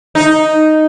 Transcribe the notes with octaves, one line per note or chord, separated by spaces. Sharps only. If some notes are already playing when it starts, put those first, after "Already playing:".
D#4